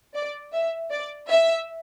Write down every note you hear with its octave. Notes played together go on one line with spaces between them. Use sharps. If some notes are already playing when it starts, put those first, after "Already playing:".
D5
E5
D5
E5